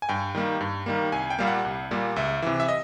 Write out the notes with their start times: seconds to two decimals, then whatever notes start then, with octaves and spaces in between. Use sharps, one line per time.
0.02 G#5
0.09 G2 G5
0.35 D#3 G3 A#3
0.61 G2
0.86 D#3 G3 A#3
1.12 C2 G#5
1.30 G5
1.39 A#2 G3 A#3 F5
1.47 F#5
1.65 C2
1.91 A#2 G3 A#3
2.16 C#2 E5
2.42 C3 E3
2.60 E5
2.68 D#5